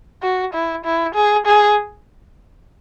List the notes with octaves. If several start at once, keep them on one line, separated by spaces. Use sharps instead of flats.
F#4
E4
E4
G#4
G#4